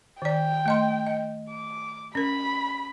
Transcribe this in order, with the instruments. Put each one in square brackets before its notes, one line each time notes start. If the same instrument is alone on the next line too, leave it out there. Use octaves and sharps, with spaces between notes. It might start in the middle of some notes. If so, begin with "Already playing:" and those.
[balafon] D#3 D5 [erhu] G5
[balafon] A3 D#5 C6
D#5
[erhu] D6
[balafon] C#4 A#4 [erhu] B5